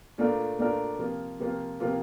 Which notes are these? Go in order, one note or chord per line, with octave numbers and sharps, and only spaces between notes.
A#2 A3 D4 F4 A#4
A#2 A3 D4 F4 A#4
C3 F3 A#3 F4
C3 F3 A#3 F4
C3 F3 A#3 F4